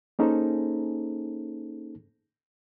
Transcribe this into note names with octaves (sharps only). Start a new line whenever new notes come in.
A#3 C#4 D#4 G#4 A4 C5